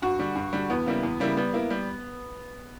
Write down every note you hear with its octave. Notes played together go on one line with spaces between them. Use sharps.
G2 F#4
D3 G3
G2
D3 G3
E2 B3
C#3 G3 A#3 E4
E2
C#3 G3 A#3 E4
G3 B3
A#3 E4
G3